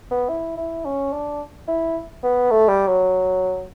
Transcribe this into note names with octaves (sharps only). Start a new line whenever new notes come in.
B3
E4
E4
C#4
D4
E4
B3
A3
G3
F#3